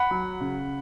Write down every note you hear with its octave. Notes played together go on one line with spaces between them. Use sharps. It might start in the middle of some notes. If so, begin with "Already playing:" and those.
Already playing: F#5 B5
F#3
C#3